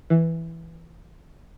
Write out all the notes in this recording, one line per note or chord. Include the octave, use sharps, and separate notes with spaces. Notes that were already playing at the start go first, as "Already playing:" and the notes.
E3